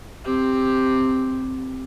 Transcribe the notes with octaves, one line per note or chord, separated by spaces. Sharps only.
C4 G4